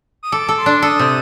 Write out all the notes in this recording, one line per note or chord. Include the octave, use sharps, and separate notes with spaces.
D#6
A4 D6
A4
C6
D4
A4 D#6
C3